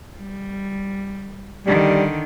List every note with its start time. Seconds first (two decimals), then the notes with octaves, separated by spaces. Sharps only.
0.17 G3
1.66 D3 D#3 G3